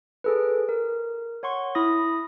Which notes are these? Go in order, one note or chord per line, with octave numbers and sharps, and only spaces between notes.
G#4 A4 B4
A#4
C#5 F#5 C6 C#6
E4 B5 D#6 A#6